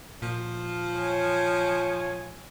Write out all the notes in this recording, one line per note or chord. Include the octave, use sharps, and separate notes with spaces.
A#2 F3
C#5 G#5